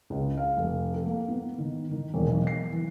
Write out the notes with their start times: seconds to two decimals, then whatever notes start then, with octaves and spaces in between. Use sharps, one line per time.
0.10 C#2
0.37 F5
0.57 F1
0.94 A4
1.06 A#3
1.28 B3
1.58 D#3
1.91 D#3
2.14 E1
2.27 B1
2.47 C7
2.71 E3